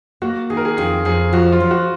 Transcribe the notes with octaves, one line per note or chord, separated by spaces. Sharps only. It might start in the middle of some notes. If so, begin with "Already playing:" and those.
A#3 F#4
D#3 G#4
A#4
G#4
F2 G#4
F2 G#4
F3 F#4
F4
F3
F#4